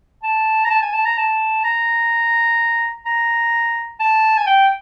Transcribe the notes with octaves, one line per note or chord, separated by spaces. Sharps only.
A5
A#5
A5
G#5
A5
A#5
A5
A#5
A#5
A5
G#5
G5